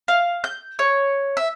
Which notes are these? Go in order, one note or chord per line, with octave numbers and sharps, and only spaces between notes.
F5
G6
C#5
E5